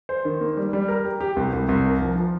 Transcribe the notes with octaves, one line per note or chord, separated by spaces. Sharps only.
C5
D#3
A#3
G3
G3
A#4
G4
G4
C2
C2
C2
A#4
F3
F3